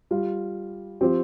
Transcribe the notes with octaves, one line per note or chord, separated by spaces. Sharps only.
G3 F4
F3 C4 G4